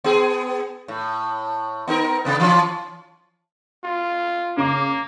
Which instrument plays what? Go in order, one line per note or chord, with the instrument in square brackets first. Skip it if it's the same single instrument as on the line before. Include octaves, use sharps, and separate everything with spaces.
[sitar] B3 G#4
A2
B3 D#4 A#4
C3 B3
E3 C#4
[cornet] F4
[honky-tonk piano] C#3 D6 [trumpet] A#3